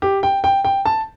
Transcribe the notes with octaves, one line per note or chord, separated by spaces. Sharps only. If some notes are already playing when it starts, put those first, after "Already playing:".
G4
G5
G5
G5
A5